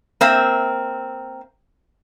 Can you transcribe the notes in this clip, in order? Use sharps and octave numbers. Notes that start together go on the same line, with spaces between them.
A#3 C4 E5